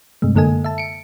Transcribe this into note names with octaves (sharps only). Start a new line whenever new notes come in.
G2 C3 G#3 A3
F#2 D3 A#3 A4 D#5 G#5
E5 A5
C#7 D7